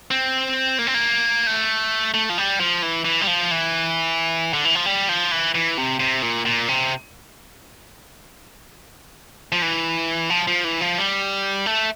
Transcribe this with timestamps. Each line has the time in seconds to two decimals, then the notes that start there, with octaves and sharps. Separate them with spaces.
0.11 C4
0.79 A#3
0.87 C4
0.94 A#3
1.47 A3
2.14 A3
2.29 F3
2.38 G3
2.60 F3
2.82 E3
3.05 E3
3.21 G3
3.27 F3
3.51 E3
4.53 D3
4.65 E3
4.75 F3
4.86 G3
5.09 F3
5.32 E3
5.55 E3
5.78 C3
6.00 C3
6.22 A#2
6.45 A#2
6.68 C3
9.52 F3
9.62 E3
10.30 F3
10.47 F3
10.64 E3
10.81 F3
10.98 G3
11.66 A3